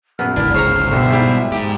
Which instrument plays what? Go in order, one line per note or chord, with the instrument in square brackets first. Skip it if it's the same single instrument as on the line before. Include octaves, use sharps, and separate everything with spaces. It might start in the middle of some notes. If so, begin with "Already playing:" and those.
[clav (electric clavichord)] A#1 F#2 B3 [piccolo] F6
[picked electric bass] G1 C#2 G#2 [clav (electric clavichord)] D4 [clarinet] E4
[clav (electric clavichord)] C#3 C#5 A#5 [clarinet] C5
[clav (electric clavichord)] G2 D3 [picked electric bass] B2 [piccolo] E5
[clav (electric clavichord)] G#2 G3 E4
[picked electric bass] G#2 [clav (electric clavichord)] G4